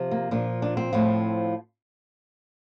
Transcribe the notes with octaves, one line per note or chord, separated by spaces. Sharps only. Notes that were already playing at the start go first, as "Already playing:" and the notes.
Already playing: C3 F3
A#3
A#2 F3 D4
D4
C4
A2 F3